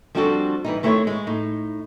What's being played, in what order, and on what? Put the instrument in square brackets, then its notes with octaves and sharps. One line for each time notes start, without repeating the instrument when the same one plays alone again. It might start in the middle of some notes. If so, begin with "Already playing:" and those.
[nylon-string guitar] F3 G3 C4 D4 F#4 A4
E3 G3 D#4
D#3 A3 C4 E4 C5 C#5
G#3
A2 D#4